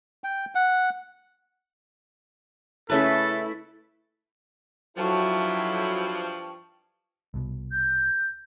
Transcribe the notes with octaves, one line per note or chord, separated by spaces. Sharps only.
G5
F#5
C#3 A3 C#4 E4 A4 B4 A5
G2 F3 F#3 E4 A4 G5 A5 C#6
C2 B2
G6